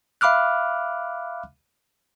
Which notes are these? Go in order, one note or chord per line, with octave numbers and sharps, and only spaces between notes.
E5 F5 B5 D6 F6 F#6